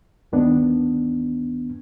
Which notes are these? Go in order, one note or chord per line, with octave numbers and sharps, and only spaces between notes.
D2 G2 D#3 B3 D4